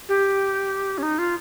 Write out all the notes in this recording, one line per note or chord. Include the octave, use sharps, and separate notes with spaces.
G4
C#4
D#4
F4